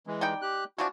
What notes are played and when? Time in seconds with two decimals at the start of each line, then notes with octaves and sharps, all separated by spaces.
0.07 E3 G#3
0.21 G3 D#4 G5
0.42 G4 F#6
0.78 E3 F3 D4 F#4